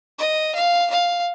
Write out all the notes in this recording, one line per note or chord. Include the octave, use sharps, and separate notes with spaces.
D#5
F5
F5